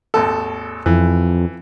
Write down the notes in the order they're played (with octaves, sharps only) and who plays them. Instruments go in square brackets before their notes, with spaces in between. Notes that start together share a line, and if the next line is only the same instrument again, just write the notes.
[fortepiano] G#1 D#2 A4
[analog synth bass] F2 [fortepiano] E3